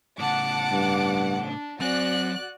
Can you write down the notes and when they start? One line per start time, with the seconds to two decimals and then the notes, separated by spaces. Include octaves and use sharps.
0.19 A2 C#3 F#5 A5 D6
0.71 G2
1.42 D4
1.80 F#3 C4 F#4 D5 G#5 F#6